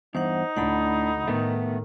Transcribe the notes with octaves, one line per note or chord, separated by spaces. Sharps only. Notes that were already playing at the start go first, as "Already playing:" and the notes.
E2 G2 D#4 C5 F#5
D2 A2 D4 F#5 B5
A2 D#3 A3 B3